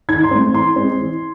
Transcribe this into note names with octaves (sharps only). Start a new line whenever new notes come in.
D#3 G#6
C6
A3 C4
E3 C6
G#3 C4
E3